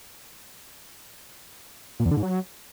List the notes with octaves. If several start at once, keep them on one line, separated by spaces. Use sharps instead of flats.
A#2
E2
D3
G#2
F#3